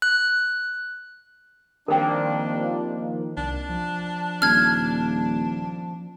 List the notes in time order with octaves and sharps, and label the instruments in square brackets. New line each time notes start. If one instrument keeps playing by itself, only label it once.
[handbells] F#6
[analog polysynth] D#3 F3 A#3 [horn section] G3 C4 D4 [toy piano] A#4 G5
[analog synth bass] C2 [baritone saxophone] D4
[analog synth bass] F3
[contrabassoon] D#1 [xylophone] F6 G#6